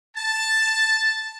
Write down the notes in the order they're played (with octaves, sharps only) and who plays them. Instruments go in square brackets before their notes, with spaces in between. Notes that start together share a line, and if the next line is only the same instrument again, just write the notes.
[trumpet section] A5